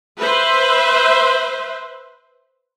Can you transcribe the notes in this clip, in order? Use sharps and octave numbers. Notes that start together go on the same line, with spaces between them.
B4 C5 E5